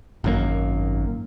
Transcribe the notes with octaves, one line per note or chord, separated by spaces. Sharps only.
G#1 F#2 A#3